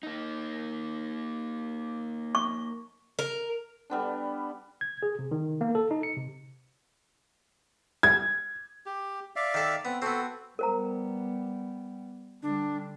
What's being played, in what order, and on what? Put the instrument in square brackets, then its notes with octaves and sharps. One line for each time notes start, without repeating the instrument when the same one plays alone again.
[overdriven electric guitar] A#3 D#4
[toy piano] C#6
[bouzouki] A#4
[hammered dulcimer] G3 B3 D4
[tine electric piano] G#6
G#4
C3
D#3
A#3
A4
D#4
C#7
C3
[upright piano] G#6
[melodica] G4
D5 E5 F5
[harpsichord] D#3 A4
[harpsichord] B3 [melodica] C4
[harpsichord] B3 C4 [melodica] F#4 A4
[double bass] G3 B3 [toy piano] A#4 C5 A#5
[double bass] D3 G3 [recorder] D4